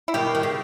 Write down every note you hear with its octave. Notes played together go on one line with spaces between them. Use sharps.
E4
B2 D#3 G4
D#3
C#3